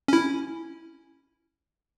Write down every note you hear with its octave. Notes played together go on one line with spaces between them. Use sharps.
C#4 E4